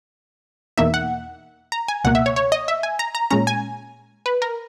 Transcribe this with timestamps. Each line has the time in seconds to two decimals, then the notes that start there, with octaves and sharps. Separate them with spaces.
0.78 E2 B2 A#3 D#4 E5
0.94 F#5
1.72 A#5
1.88 G#5
2.04 C#2 B2 A#3 F#5
2.15 E5
2.26 C#5
2.36 C#5
2.52 D#5
2.68 E5
2.83 G#5
2.99 A#5
3.15 A#5
3.30 A#2 G#3 C#4 A#5
3.47 G#5
4.26 B4
4.42 A#4